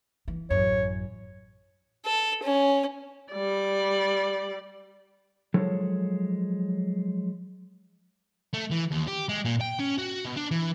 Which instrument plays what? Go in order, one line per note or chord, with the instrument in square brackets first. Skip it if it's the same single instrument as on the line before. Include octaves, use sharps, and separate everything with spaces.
[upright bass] E3
[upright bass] A1 F#2 [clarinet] C#5
[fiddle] A4
C#4
[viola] G3 D5
[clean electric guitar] F3 F#3 G#3 A4 C#5
[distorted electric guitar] A3
E3
D#2
G4
G#3
A#2
G5
C#4
F#4
B2
D4
E3